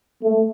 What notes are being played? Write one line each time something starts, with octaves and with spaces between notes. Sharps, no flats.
A3